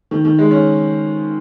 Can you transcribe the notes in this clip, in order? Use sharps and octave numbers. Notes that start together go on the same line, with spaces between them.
D#3
D#3
G#3
C#4